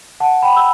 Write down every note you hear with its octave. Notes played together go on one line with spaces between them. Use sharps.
F#5 A5
G5 B5
E6